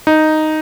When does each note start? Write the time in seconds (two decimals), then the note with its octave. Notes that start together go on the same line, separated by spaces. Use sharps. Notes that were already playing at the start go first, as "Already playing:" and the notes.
0.07 D#4